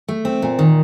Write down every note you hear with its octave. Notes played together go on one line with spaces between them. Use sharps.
A3
C4
A#2
D#3